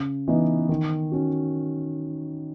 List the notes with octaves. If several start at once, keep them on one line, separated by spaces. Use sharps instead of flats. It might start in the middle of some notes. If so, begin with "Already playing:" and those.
Already playing: C#3
E3 B3 D#4
D#3
C#4 F#4